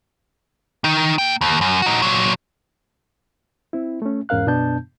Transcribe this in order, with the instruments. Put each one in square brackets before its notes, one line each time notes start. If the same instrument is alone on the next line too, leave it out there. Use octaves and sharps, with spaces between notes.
[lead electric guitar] D#3 D#4
A#3 G5
D#2
F#2
D#4 F#4
A#2 F#3
[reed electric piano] C4 E4
A3 C#4
E2 G#2 C#4 A#4 F5 F#6
F#2 B2 B3 D4 A5 G6